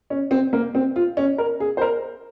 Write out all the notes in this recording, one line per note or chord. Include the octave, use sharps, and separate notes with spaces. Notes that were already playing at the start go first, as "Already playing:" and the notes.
C#4
C4
A#3
C4
F4
C#4
A#4
G#4
C5
A#4